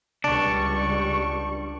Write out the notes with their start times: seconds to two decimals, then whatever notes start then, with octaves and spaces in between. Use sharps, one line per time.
0.24 C#2 G3 D4 C#6